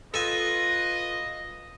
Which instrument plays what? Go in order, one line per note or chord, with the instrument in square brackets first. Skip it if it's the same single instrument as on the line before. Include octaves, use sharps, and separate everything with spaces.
[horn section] F4 B4 [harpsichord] A4 G#5 [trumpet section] D#5